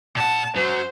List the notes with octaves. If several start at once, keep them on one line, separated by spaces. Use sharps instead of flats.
A#2 F#5 A5
F#2 F#3 C5